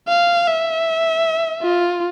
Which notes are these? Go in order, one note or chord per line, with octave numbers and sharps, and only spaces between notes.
F5
E5
F4